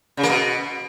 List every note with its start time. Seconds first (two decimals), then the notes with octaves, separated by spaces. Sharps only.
0.17 C#3
0.23 A#3
0.29 B2